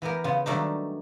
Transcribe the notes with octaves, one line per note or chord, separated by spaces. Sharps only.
E3 B3 G4 A#4
C#3 B3 F4
D#3 F#3 G3 A3 D4 D#4